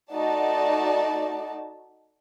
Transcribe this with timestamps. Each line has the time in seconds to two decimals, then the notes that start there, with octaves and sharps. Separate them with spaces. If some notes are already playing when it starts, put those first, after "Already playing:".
0.13 A3 D#4 F#4 D5 A5